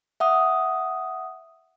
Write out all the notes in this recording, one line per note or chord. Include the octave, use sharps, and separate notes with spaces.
E5 F#5 D#6